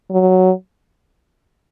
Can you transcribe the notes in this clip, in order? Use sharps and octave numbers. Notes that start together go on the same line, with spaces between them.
F#3